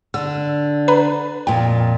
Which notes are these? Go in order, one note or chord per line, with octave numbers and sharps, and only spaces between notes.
D3 E6
B4 A#5 B5
F2 A#2 G5